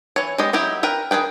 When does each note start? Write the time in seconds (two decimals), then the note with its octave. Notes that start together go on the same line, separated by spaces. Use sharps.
0.16 E3 C#5
0.38 G#3 B3 G4 D#5
0.53 F#3 D#4 E4 G4
0.83 A#4 B4 G5
1.11 D#3 G#4 B4 G5